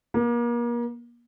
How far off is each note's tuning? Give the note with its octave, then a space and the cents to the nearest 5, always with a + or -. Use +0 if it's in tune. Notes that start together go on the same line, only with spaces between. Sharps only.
A#3 +35